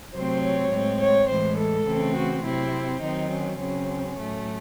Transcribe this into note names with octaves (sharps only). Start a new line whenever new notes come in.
C3 F#3 A3 C4 C5
C#5
A2 G#3 C4
C#5
A2 E3 G#3 C5
A4
C#3 E3 A3 C4
F#4
C3 F#3 C4 E4
D#3 F#3 C4 D#4
C#4
C#3 F#3 C4 C#4
A2 F#3 A3